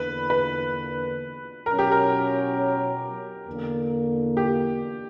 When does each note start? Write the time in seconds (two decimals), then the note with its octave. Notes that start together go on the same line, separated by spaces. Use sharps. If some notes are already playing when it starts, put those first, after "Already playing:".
Already playing: E2 D3 A#3 D4 B4
0.30 B4
1.65 B2 F#3 C#4 A#4
1.79 G4
1.92 A#4
3.47 E2 D3 A#3
4.37 G4